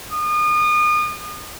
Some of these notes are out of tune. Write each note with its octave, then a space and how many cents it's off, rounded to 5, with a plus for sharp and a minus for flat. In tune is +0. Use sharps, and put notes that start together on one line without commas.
D#6 -35